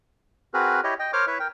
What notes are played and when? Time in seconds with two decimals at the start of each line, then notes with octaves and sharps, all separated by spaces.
0.54 C4 F#4 G#4 A#4 B4
0.84 E4 G4 C#5 D#5
0.99 D#5 G5
1.13 A#4 C5 C#5 D6 F6
1.27 E4 B4 C#5 E5
1.40 A#4 G5